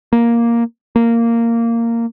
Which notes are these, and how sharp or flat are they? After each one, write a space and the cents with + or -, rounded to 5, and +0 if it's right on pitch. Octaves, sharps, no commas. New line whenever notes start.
A#3 +5
A#3 -10